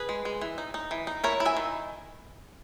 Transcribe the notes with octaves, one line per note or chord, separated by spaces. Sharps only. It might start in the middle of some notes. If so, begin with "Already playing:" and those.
Already playing: G#4 B4
G#3
G#3
E3
D#4
D#4
E3
D#4
E4 A#4 C#5
E4
E5 G#5
D#3